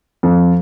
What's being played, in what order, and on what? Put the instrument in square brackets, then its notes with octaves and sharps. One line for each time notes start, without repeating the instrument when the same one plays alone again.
[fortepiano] F2